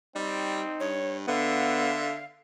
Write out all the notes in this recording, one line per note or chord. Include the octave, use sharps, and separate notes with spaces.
G3 C4 D#4
G2 C#5
D3 B3 E5 F5